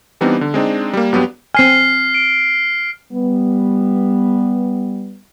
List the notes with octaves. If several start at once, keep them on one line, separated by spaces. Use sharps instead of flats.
E3 G3 B3 C4 D4 D#4
D3
G#3 C4 D4 D#4
G3 A#3
G2 F#3 B3 D4 G4
C4 G#5 F6 C7
D7
G3 B3